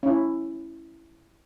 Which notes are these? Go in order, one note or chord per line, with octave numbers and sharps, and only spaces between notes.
C#4 E4